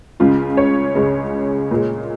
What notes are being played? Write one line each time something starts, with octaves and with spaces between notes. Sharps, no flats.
C#2 C#3 G#3 F4
C#5
C#2 C#3 G#3
A#2 G#3